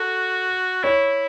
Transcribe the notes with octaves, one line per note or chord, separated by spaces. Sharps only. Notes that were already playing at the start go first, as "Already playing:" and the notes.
Already playing: F#4 A4
E4 C#5